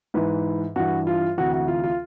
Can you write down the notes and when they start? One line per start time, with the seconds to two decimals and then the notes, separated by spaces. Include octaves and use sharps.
0.14 G#2 E3 B4
0.76 G2 E3 F#4
1.07 F4
1.37 D2 C3 E3 F#4
1.53 F#4
1.68 F4
1.84 F4